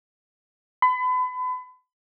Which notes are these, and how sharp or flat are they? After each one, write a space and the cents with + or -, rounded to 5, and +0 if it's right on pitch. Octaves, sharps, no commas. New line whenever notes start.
B5 +35